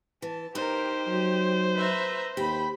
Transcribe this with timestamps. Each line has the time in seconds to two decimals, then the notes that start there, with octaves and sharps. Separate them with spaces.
0.22 E3 A5
0.55 D#4 G4 A#4 C5
1.07 F#3 G4
1.75 B4 E5 A#5
2.37 D#2 G4 B5